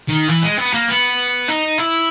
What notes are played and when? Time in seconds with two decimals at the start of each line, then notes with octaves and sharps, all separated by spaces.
0.09 D#3
0.28 E3
0.43 G#3
0.58 B3
0.73 A#3
0.88 B3
1.48 D#4
1.78 E4